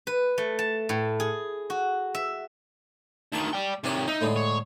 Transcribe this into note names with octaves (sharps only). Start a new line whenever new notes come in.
B4
A3
A5
A2
G#4
F#4
E5
D2 D#3 A5 C#6
D5 G5
C3 D#3 C#5 D5 G#5
D#4 E5
A2 D3 G#3
C#5